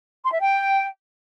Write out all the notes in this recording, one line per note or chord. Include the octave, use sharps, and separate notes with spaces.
C6
E5
G5